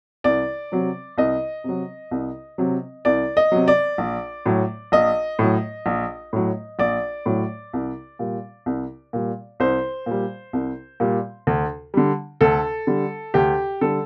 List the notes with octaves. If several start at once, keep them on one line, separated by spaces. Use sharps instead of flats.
C2 D5
C3 F#3
C2 D#5
C3 F#3
C2
C3 F#3
C2 D5
D#5
C3 F#3
D5
A#1
A2 F#3
A#1 D#5
A2 F#3
A#1
A2 F#3
A#1 D5
A2 F#3
C2
A#2 G3
C2
A#2 G3
C2 C5
A#2 G3
C2
A#2 G3
D2
D3 G3
D2 A4
D3 G3
D2 G4
D3 G3 A4